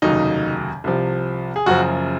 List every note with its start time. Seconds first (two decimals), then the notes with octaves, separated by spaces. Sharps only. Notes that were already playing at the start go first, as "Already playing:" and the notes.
0.02 F1 D#2 C#3 F#3 D#4
0.84 C2 C3 F3
1.56 G#4
1.66 F#1 F#2 C#3 F3 F#4